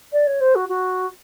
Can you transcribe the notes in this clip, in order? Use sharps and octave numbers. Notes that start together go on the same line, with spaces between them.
D5
C#5
C5
F#4
F#4